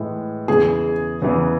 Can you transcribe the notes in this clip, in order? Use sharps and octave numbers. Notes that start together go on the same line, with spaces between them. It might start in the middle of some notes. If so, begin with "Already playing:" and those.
Already playing: A2 E3 G#3
E2 C#3 E3 G#4
E2 C#3 E3